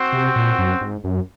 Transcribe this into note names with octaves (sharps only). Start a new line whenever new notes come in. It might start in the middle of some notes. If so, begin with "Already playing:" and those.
Already playing: C4 F#4 C5 F#5
C3
A#2
F#2
G#2
F#2